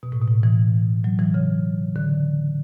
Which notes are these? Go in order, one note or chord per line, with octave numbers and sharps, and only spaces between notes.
B2
A2
B2
A2
E3
F#3
E3
C#3
D3